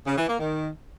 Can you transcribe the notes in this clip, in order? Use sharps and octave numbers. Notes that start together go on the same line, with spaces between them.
C#3
E3
A#3
D#3